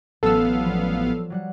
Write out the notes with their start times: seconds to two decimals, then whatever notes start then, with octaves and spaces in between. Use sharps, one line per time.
0.23 A1 F#3 B3 F4 A4 B4 F5 E6
0.65 F3 G3
1.30 F#3 G3 F#5